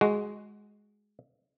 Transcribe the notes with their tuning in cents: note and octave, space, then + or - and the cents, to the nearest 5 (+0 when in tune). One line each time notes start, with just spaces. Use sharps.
G#3 +0 F#4 +0